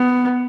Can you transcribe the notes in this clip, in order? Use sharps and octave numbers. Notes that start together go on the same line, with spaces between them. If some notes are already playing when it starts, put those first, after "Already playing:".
Already playing: B3